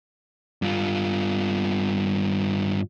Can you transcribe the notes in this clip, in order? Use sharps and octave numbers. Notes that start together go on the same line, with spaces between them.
G2 F4